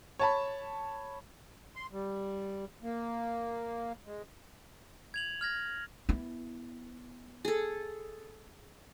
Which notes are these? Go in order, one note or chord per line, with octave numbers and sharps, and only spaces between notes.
C#5 A5 B5
C6
G3
A#3
G#3
G#6 F7 F#7
F6 G#6 A#6
B3 E4
G#4 A4